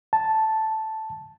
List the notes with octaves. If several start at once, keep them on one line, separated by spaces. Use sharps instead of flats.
A5